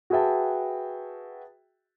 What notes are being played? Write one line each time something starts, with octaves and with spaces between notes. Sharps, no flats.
F#4 G#4 B4 E5 G5 A5